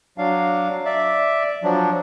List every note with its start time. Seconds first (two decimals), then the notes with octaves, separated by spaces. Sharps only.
0.18 F#3 D4 F5
0.85 D5 E5
1.63 F3 F#3 D4